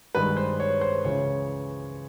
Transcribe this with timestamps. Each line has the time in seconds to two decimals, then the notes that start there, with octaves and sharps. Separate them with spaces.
0.15 G2 D#3 G#3 B4
0.37 C5
0.60 C#5
0.81 C5
1.04 C#2 C#3 E3 C#5